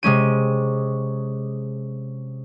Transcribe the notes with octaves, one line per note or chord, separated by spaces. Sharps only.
C3 G#3 C#4 D#7